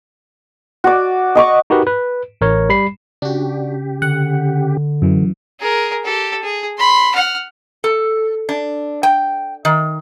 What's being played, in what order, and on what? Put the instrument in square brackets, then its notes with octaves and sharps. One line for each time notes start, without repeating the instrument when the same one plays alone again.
[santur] F#4 D5
D#5 C#6 D6
[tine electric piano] D#4 F#4 G4 A#4 B4
B4
A1 A#4 C#5
G3 B5 C7
[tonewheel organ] C#3 G4 [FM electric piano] D4 F#4
[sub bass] D3 [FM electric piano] F#5
[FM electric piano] F#2 E3
[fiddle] G#4 A#4
G4 A4
G#4
B5 C6
F#5 F6
[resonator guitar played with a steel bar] A4
D4
G5
D#3